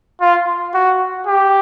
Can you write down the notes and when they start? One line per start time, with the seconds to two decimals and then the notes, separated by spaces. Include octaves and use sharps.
0.21 F4
0.74 F#4
1.27 G4